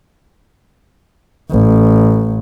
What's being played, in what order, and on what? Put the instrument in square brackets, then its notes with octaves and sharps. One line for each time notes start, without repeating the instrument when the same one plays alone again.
[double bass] A1